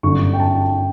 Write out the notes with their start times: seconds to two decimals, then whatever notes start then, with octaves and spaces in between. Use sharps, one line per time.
0.03 G1 F#2 D3 C#6
0.33 G5
0.40 A5